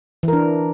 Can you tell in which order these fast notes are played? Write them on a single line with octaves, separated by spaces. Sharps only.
E3 A#4 D4